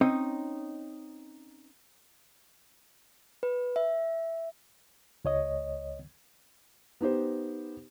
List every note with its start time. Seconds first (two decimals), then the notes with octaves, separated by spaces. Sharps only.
0.01 C4 C#4 D#4 C#5 D#5
3.43 B4
3.76 E5
5.25 C#2 C#5 D#5
7.01 B3 D#4 G4 C5